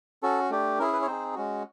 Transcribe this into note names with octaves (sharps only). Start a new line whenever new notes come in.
C#4 F#4 A4
A3 D4 G4
C#4 E4 G#4 A#4
B4
C#5
C4 D#4 G#4 C5
G#3 C#4 F#4